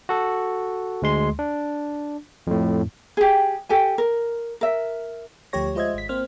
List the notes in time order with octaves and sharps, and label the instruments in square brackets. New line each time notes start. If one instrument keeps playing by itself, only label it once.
[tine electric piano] F#4 A4
D2 G#3 C6
D4
F2 A2
[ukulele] G4 G#4
G4 A4 G#5
A#4
A#4 E5
[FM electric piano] D2 F3 A3 G4 C#5 A#6
G#3 F4 C5 D#5 E5 G#6
G#1 B6
A#3 C4 C5 F6